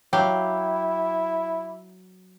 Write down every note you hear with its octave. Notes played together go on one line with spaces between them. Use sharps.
F#3 E4 G4 F5